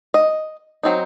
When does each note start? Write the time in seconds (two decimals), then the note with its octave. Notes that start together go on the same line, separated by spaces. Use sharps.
0.14 D#5
0.83 F#3 C4 D#4